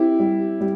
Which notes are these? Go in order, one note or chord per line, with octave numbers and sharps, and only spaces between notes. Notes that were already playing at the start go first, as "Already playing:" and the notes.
Already playing: C4 E4 G4
G3
G3